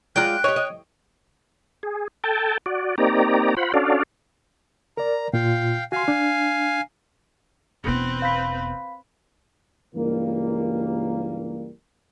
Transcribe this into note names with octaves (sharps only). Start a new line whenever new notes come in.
F#3 G#3 F4 D5 G5 A#5 F#6
G4 C#5 D#5
D#5
G#4
A4 G5 A5
F#4 D5
A#3 C4 D#4 G4 D5 A#5
F4 C5 F#5 B5
C#4 D4 F#4 A4 D5 F5
A#4 D5 A#5
A#2 F4 F5 G5
F#4 F5 G#5 C6
D4
E1 B3 C4 B4
F5 B5 B6
C#2 G2 E3 G3 A#3